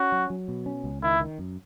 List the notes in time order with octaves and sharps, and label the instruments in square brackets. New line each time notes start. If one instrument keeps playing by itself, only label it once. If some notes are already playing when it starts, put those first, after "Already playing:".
Already playing: [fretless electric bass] C#4 [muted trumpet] F#4
[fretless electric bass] F#3
F#3
B2
C#4
C#2
[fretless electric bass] D#3 [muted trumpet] E4
[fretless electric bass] D#3
F#2